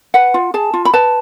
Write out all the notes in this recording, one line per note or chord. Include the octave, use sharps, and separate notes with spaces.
B4 F#5
F4
G#4 A5
F4
B5
B4 A5